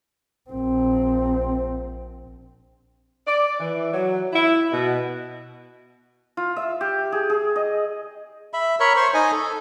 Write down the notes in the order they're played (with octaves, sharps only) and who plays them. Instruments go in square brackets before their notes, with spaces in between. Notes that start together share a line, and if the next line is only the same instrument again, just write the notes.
[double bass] A#1 C4
[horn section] D5
E3
F#3
E4
B2
[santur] F4
E5
G4
G#4
G#4
D#5
[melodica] E5 B5
A#4 C#5 B5
C5 C#6
D#4 D#5 G#5
A4